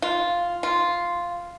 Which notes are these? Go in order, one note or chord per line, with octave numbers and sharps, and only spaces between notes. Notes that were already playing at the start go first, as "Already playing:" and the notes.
F4
F4